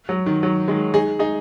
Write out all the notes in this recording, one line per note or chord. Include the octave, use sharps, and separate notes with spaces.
F#3
D#3
F#3
D#3 G#3
D#4 G#4
D#4 G#4